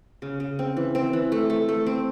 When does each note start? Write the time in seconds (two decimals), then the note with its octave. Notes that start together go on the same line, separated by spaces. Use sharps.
0.22 C#3
0.40 C#3
0.59 C4
0.77 E3
0.95 C4
1.13 E3
1.32 A3
1.50 A3
1.69 A3
1.86 C4